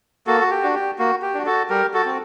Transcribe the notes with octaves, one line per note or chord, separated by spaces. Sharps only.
A#3 F#4 A4
F#4
G4
D4 F#4
G4
A#3 F#4
G4
D4 F#4
F#4 A4
G3 G4 A#4
F#4 A4
C4 F#4